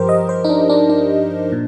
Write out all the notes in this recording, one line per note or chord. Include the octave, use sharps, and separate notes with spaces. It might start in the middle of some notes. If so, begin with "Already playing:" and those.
Already playing: G2 F3 G4 A#4 C5
D#5
C5
D#4
D4
D4
D4
A#2